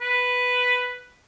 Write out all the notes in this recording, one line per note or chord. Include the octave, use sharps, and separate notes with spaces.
B4